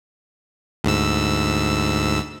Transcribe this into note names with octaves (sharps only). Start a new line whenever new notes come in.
D2 G#2 E6